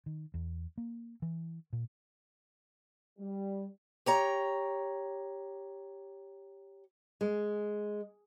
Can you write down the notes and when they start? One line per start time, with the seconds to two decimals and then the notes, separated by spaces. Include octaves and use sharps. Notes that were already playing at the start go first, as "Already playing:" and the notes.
0.06 D#3
0.34 E2
0.78 A#3
1.22 E3
1.73 A#2
3.19 G3
4.06 G4 C#5 A#5
7.21 G#3